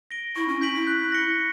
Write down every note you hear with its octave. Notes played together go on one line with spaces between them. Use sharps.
A#6 D7 G7
E4 C#6
C#4
C#4 G6 B6 D7 F#7
E4
F#6
A#6 C#7 G7